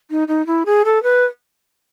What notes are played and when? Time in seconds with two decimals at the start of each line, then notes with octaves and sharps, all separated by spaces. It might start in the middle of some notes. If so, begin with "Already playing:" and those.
0.10 D#4
0.28 D#4
0.46 E4
0.66 G#4
0.85 A4
1.03 B4